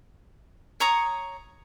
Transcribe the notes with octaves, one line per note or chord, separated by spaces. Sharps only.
C#5 A#5 C#6 D#6